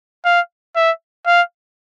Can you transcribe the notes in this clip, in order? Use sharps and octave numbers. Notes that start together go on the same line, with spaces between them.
F5
E5
F5